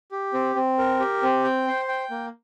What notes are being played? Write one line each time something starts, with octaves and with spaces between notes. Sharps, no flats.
G4
C4
C4
A#4
G4
C4
G5
C5
G5
A#3